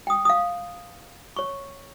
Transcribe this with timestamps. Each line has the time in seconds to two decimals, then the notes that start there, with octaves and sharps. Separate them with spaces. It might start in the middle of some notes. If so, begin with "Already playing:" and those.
0.07 G5 D#6
0.25 F5 D#6
1.36 C#5 C#6